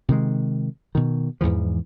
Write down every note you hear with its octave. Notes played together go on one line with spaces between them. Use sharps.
C3 D#3 G#3
B2 D#3
E2 G#2 E3 F3